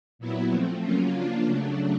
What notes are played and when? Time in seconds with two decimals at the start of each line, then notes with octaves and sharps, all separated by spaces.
0.19 A#2 F#3 B3 E4
0.51 F3 A3 C4
0.82 C#3 F#3 A#3 C#4 F4
1.14 F3 A#3 D4 F4
1.45 C#3 F#3 A3 D4